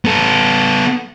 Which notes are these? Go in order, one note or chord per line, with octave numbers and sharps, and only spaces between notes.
B3 A4